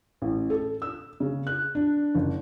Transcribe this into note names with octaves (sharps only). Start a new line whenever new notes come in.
A1
A4
E6
C#3
F#6
D4
F#1